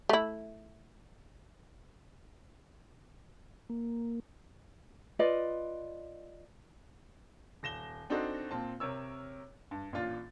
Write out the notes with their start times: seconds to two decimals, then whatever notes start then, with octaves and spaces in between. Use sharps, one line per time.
0.09 A3 E4
3.69 A#3
5.19 F4 B4 D5 D#5
7.63 D#1 A#6 E7 G7
8.10 C4 D4 D#4 F#4 A4 C5
8.51 A#2 C4 A5
8.80 C3 A#4 C#5 E6
9.71 G2
9.93 A1 A#2 D4 F4 A6